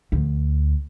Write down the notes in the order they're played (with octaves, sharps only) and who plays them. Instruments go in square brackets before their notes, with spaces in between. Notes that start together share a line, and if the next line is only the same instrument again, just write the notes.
[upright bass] D2